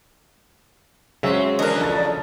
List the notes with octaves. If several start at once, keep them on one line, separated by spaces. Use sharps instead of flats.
C#3 F#3 G#3 C4 C5 C#5 E5
D3 E3 D4 A#4 D#5
E2 A#2 F3 A4 A6